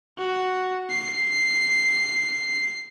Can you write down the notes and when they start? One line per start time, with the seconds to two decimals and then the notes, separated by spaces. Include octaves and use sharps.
0.18 F#4
0.90 C7